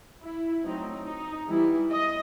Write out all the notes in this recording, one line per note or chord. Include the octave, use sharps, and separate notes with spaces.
E4
F#3 A3 C4 D#4
D#4
E3 G3 B3 E4
D#5